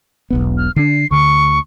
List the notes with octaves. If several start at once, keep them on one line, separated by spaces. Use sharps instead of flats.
E1 B1 B3
F6
D3 D4 C7
D2 D3 C#6